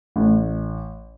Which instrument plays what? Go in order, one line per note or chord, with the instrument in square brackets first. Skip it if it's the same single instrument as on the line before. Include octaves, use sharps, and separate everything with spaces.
[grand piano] A1